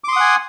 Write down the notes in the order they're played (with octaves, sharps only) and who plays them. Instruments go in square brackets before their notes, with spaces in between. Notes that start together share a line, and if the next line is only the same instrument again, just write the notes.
[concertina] D6
C6
D#6
F#5
G#5